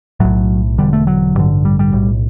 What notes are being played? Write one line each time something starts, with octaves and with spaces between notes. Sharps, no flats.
B1 A2 F#3
E1 E2 D3 G3
A3
F#3
A1 G2 D3
G3
G3
B1 A2